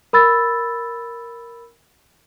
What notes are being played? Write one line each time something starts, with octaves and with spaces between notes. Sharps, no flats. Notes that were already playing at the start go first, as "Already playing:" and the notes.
A#4 B5 E6 A6